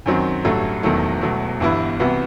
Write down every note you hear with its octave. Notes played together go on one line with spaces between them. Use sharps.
F#2 D#3 F#3 C4
A1 G2 F#3 A3
E1 E2 D#3 F#3 A3
E1 E2 B2 F#3 A3
G1 G2 E3 B3 E4
C2 C3 E3 B3 F#4